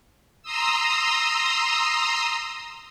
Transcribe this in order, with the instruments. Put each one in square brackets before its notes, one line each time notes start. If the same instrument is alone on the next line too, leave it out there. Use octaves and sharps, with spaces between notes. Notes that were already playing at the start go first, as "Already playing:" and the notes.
[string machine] A#5 C6 D#6 E6